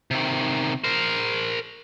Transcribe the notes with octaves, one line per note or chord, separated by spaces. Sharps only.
C3 D#3
A#4 C5